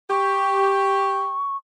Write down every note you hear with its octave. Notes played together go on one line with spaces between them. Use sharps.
G4 C#6